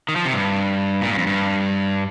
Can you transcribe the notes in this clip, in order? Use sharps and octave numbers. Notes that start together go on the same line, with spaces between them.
D#3
F3
C3
G2
A#2
G2
F2
G2